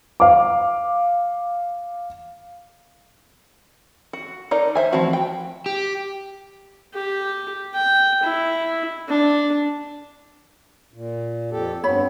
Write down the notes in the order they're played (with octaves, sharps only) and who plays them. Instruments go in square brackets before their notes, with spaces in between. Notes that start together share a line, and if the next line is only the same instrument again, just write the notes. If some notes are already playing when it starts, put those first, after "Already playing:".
[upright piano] F5 D6
[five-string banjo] F#4
D#4 A4 A#4 D5
C5 E5 G#5
E3 F3 A3 C4 F#4
G5
[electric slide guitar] G4
[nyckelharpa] G4
G5
E4
D4
[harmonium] A#2
F2 G4 A4
[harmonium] G2 B3 C4 [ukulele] C#5 B5